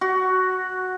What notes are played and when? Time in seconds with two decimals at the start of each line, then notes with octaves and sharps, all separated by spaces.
0.01 F#4